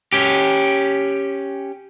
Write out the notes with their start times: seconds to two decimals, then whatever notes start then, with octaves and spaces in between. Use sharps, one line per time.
0.13 C#4 G4